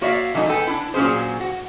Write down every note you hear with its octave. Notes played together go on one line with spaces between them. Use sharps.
A#3 F#4 C#5 D5 E5 F5
E3 F#3 A3 D#4
B3 A4 G5 G#5
D4 E4
A#2 F#3 C#4 G#4 C5
F#4